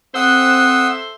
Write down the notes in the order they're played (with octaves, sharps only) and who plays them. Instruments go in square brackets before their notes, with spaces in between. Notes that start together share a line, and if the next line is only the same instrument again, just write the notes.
[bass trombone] C4 [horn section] A4 C5 E5 [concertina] F#5 D#6 E6 [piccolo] F#6